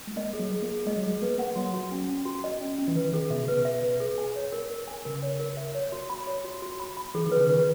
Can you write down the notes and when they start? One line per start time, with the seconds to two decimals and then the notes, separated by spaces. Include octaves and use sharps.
0.07 G#3
0.16 A#3 D#5
0.33 G#4
0.40 F#3
0.51 G#4
0.62 A#3
0.68 G#4
0.86 G#3 D#5
0.96 F#3
1.03 G#3 G#4
1.22 A#3 B4
1.38 A#3 F#5
1.55 F#3 F#4
1.74 F#4
1.91 C#4
2.08 C#4
2.25 F#4
2.44 D#5
2.61 C#4
2.78 C#4
2.88 E3
2.95 D#3 B4
3.13 D#3 G#4
3.30 B2 E5
3.44 C#3
3.48 B2 B4
3.65 E5
3.83 B4
4.00 G#4
4.18 G#5
4.36 C#5
4.52 A#4
4.70 A#4
4.88 G#5
5.05 C#3 A#4
5.23 C#5
5.40 A#4
5.57 E5
5.75 C#5
5.92 F#4
6.10 B5
6.27 C#5
6.44 F#4
6.62 F#4
6.80 B5
6.97 B5
7.15 E3 G#4
7.27 D#3 B4
7.37 C#3
7.49 D#3 B4